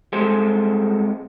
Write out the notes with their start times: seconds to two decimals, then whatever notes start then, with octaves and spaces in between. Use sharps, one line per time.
0.13 C2 G#3 G#4 A4 C5